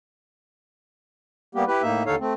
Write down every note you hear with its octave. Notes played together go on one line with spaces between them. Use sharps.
G3 A#3 B3 G4
E4 G4 B4
A2 A#3 D#4 E5
D#2 D3 D#4 A4 C#5 F5
A3 C4